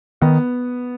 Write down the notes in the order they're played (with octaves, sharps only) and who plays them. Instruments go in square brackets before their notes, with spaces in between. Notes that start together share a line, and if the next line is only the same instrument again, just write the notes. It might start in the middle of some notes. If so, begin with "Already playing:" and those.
[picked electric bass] D#3 [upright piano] B3